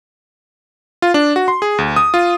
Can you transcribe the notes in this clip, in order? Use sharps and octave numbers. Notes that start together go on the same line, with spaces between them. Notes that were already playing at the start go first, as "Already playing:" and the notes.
F4
D4
F#4
C6
G#4
D2
D#6
F4